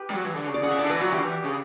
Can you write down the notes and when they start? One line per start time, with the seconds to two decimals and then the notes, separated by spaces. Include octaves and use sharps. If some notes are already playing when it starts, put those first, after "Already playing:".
Already playing: G4 B4
0.10 G3
0.14 F#3
0.25 E3
0.35 D3
0.47 C#3
0.54 D5
0.63 C#3 F#5
0.71 E5
0.79 D3 D5
0.90 E3 B4
1.00 F#3 F#4
1.12 E3 G4
1.18 D3
1.23 E3
1.44 C#3